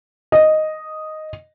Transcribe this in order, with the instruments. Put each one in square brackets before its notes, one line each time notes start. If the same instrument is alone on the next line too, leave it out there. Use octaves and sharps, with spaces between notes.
[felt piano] D#5